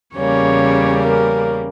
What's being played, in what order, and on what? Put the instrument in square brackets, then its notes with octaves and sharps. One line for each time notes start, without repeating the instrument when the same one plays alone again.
[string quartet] E2 C#3 G3 A#3 C#4 [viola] C#5
[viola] A#4